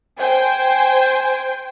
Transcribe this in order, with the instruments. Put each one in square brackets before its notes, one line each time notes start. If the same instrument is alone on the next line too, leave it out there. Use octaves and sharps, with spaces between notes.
[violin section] C5 G5 G#5